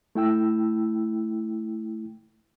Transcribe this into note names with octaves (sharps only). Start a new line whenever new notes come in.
A3 E4 G5 E6